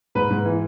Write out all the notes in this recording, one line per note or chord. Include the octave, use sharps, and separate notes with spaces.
G#2 B4
G#2
E3